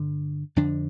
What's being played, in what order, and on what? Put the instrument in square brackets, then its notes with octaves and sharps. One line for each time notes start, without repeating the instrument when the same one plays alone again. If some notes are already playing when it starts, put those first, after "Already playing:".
Already playing: [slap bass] G2 D3
F2 D3 D4